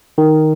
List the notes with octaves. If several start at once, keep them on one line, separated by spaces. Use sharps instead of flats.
D#3